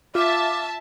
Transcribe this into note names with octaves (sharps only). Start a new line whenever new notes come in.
F4 E5 A5 D6